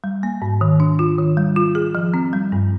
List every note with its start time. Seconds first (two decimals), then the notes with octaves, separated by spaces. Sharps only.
0.04 G3
0.23 A#3
0.42 G#2
0.61 D#3
0.80 D4
0.99 F4
1.19 D#3
1.37 G3
1.56 F4
1.75 G#4
1.95 F3
2.14 C4
2.33 G3
2.52 G2